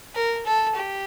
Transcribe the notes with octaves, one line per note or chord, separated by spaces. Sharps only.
A#4
A4
G4